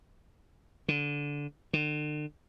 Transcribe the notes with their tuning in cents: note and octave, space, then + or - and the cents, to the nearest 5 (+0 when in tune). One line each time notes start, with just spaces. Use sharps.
D3 -15
D3 +40